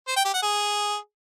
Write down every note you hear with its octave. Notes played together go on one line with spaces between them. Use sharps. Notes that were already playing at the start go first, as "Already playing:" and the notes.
C5
G5
G4
F#5
G#4